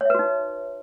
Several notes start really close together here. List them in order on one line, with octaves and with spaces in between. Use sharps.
C#5 E5 B4 F#4 D#4